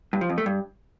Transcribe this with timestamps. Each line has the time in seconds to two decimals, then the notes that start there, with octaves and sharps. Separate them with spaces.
0.13 G2
0.21 F3
0.29 F2
0.38 A3
0.46 G2